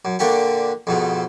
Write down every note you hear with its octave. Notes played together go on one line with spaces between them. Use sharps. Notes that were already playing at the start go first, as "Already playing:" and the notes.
F#2
A#2 D3 D4 G4 C#6
F2 G#2 B2